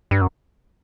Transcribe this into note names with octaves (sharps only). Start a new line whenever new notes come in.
G2
F#2